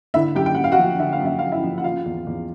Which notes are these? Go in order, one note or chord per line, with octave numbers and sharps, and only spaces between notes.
D3 E4 E5
F#2 G4 G5
G5
F#2 F#5
F5
F#4 F#5
F3
D3 E5
F5
F#2
E5
F#2 F5
E4 E5
F3
F#5
C#3 F4 F5
E2
E2